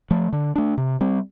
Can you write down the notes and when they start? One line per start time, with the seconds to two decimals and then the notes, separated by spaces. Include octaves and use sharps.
0.11 F3 A3
0.33 D3
0.56 A3 D4
0.77 C3
1.01 G3 C4